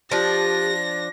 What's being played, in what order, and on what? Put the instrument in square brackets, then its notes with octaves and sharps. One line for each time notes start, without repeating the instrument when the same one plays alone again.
[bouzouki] F3 D4 [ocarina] G4 [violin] A#6